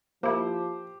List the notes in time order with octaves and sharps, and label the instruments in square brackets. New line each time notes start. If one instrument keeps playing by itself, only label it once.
[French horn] F3 [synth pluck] A#3 E4 [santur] G4 [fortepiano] C5